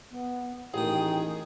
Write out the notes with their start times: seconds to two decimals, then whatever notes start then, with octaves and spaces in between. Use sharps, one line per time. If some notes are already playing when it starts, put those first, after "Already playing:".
0.11 B3
0.74 A1 D#3 G#4 G5 D#6